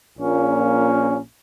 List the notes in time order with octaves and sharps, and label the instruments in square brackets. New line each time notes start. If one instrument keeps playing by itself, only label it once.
[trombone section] A#1 A#2 A#3 C#4